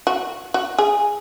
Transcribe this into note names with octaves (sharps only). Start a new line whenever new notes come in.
F#4
F#4
G#4